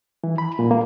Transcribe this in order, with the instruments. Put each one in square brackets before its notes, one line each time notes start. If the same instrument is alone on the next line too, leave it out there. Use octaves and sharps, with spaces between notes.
[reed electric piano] E3
B5
A#2
A#3